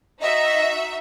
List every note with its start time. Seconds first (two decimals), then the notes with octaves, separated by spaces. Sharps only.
0.22 D#4 F#4 D#5 E5